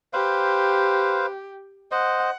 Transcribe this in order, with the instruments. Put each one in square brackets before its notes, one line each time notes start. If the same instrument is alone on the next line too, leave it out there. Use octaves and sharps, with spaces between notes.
[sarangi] G4 [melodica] B4 C5 F5
[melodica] C5 D#5 [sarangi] F#5